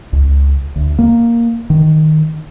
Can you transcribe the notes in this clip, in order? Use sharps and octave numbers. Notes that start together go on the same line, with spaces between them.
C#2
D2
A#3
D#3